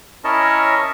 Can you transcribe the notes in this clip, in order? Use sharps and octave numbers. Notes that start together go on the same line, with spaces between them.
C#4 E4 A#4 C#5 D#5 A5